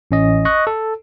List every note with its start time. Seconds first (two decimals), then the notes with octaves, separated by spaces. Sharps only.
0.11 A1 C#4 D#5
0.45 D#5 C#6 F#6
0.67 A4